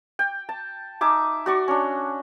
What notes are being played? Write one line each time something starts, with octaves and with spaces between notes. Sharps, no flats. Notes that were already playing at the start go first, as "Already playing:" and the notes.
G5
A5
D#4 E5 G#5 D6
F#4 D5 C#6
C#4 D4